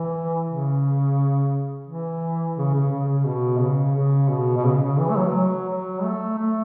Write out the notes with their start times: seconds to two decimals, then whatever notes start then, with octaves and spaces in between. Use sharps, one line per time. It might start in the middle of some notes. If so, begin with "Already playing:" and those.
Already playing: E3
0.49 C#3
1.87 E3
2.57 C#3
2.74 C#3
2.91 C#3
3.09 C#3
3.26 B2
3.61 C#3
3.95 C#3
4.30 B2
4.57 B2
4.65 C#3
4.82 C#3
4.99 E3
5.10 A3
5.16 F#3
5.34 F#3
5.69 F#3
6.03 A3
6.38 A3